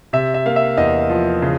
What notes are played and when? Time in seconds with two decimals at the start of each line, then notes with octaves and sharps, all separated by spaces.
0.13 C3 E5
0.34 E5
0.46 A#3 F5
0.56 E5
0.77 E2 D#5
1.10 F3
1.42 C#3